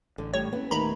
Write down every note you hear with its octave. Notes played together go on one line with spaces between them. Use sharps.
A1 D3
A2 G3 C#5
A#3 B3 C#4
D#1 D#2 D#3 A3 B3 A#5 B5